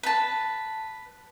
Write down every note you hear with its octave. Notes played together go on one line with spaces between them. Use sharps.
B4 A5